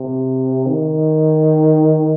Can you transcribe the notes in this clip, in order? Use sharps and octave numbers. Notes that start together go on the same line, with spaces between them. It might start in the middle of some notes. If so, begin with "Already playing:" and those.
Already playing: C3
D#3